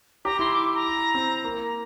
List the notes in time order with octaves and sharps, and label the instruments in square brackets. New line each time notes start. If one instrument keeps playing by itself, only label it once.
[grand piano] G4 [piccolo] A#5
[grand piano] E4 [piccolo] C6
[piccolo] D6
C6
A#5
[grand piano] C4
[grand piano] A#3 [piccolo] A#5